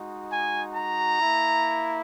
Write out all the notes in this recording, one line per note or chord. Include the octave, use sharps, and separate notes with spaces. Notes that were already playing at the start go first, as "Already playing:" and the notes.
Already playing: G#3 D#4 F#4
G#5
A#5
A#3 E4